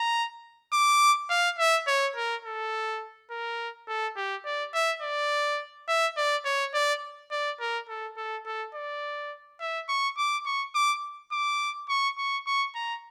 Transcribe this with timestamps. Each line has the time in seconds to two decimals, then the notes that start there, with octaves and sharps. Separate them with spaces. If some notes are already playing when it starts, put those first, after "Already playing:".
Already playing: A#5
0.73 D6
1.30 F5
1.59 E5
1.87 C#5
2.16 A#4
2.45 A4
3.31 A#4
3.88 A4
4.16 G4
4.45 D5
4.74 E5
5.02 D5
5.88 E5
6.17 D5
6.45 C#5
6.74 D5
7.31 D5
7.60 A#4
7.89 A4
8.17 A4
8.46 A4
8.74 D5
9.60 E5
9.89 C#6
10.17 D6
10.46 C#6
10.75 D6
11.32 D6
11.89 C#6
12.18 C#6
12.47 C#6
12.75 A#5